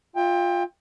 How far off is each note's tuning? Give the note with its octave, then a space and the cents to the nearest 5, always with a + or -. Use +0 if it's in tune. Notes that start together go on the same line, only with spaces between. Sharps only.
F4 +10 E5 -30 G5 +25